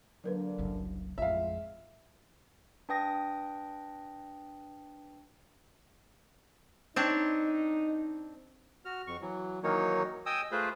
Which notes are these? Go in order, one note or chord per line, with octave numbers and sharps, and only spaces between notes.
D3 F#3 A#3 D4 A#4 B4
F#1 C2 F#2
A1 F2 G#3 F4 E5 F5
D4 B4 G5 D#6 A#6
C4 D4 D#4 C#5
F#4 F6
F2 C#6
E3 F#3
D#3 E3 F#3 A#3 D#4 C#5
D#5 G5 G#5 D#6 E6
A3 F4 G#4 B4 C5